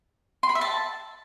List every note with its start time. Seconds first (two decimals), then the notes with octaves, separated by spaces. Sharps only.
0.43 C6
0.49 B5
0.55 E5
0.61 A5